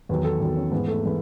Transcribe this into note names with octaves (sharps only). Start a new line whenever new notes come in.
E2 D#3 F#3 B4
A4
E2 D#3 F#3
C#4
G#2 E3 B3
A3
E3 G#3